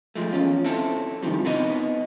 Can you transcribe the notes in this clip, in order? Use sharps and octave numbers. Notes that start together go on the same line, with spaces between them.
F3 G#3 A3
E2 C#4 F4
C4 E4 A4
G#2 C3 D#3 F3 G3
B3 C4 D#4 D#5